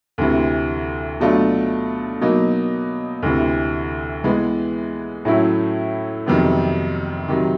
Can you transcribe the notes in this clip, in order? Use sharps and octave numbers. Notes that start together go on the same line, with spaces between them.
D2 C3 E3
B2 F#3 A3 D4 F4
B2 F#3 A#3 D#4
D2 C3 E3
E3 G#3 B3
A2 F#3 A3 C#4 E4
F2 C3 D#3 F#3 B3
C3 D#3 F#3